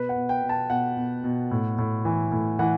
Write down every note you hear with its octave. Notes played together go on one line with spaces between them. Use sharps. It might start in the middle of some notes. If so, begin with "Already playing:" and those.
Already playing: B2 B4
F#5
B2
G5
B2
A5
B2 F#5
B2
B2
A2
A2
E3
A2
E3 F#5